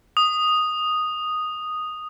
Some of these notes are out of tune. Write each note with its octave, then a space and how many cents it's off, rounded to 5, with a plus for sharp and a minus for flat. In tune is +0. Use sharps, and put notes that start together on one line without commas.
D#6 -5